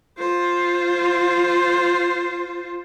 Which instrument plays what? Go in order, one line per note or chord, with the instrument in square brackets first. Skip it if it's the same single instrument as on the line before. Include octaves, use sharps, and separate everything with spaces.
[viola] F4 C5